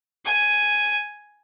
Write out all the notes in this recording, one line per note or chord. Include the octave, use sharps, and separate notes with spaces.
G#5